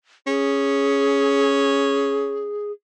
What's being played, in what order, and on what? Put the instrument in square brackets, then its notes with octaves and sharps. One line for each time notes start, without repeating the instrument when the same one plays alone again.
[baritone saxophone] C#4 [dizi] G#4